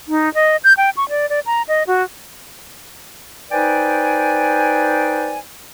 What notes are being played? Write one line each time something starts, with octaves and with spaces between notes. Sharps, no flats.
D#4
D#5
G6
G5
C#6
D5
D5
A#5
D#5
F#4
D#4 B4 C5 D5 G5 G#5